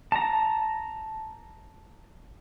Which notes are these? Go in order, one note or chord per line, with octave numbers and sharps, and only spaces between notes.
A5 A#5